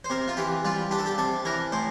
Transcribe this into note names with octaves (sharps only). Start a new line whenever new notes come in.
C5
C3 A#4
F4
E3 G4
G3 F4
D4 G4
A4
G4
C3 A4
E3 A#4
A2 C5